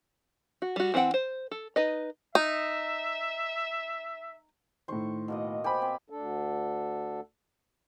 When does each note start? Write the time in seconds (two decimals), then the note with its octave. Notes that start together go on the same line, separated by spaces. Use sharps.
0.62 F#4
0.76 G3 F#4
0.94 E3 C4 F4 F#5 G5
1.14 C5
1.51 A4
1.76 D#4 B4 D#5
2.35 D#4 E5
4.88 A2 D#3 C5 C#6
5.28 B2 A#3 D#5
5.64 G4 C5 G#5 B5
5.82 C4
6.10 D2 D4 A4